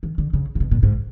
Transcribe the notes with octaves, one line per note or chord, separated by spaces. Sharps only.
D#3
D3
C#3
C3
B2
A#2
G#2